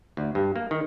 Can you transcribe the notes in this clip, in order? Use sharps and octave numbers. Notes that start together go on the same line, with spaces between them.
D2
G2
A#3
D#3